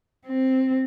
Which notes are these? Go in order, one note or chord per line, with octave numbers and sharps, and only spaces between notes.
C4